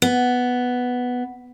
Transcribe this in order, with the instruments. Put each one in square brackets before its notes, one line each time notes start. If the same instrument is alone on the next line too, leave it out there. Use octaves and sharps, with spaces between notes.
[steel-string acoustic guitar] B3